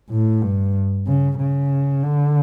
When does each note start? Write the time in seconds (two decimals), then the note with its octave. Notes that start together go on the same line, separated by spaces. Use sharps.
0.10 A2
0.42 G2
1.06 C#3
1.39 C#3
2.03 D3